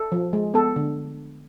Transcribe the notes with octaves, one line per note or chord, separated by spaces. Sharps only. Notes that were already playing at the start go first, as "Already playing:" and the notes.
Already playing: A4
F3
G#3
B3 A4
D3